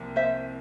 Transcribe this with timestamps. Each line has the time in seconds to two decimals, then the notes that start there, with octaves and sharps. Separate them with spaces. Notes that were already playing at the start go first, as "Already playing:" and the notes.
Already playing: C2 C3 F3 A#3
0.16 C5 E5